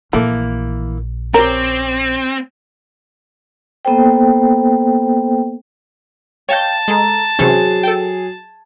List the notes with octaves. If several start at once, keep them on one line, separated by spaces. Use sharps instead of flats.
A#1 E3 A3 A#3
C4 C#4 G4 A#4
A#3 B3 A4 C5 G5
C#5 D#5 F5 G5 A5 G6
G#3 A4 A#5
C3 E3 F#3 C#4 G#4 C5 B5
A4 G5